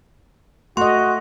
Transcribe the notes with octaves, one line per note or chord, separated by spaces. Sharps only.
A3 F#4 D#5 C6